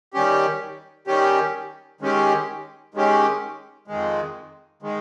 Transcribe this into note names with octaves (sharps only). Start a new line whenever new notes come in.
D#3 G3 C#4 G4
D#3 G3 C#4 G4
D#3 G#3 C#4 G4
D#3 G#3 C#4 G4
F2 D#3 G#3
D#3 G#3